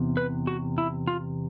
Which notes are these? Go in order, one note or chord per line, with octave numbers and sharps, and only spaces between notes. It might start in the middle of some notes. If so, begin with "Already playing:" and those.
Already playing: E2 C3
B4
F#4
E4
F4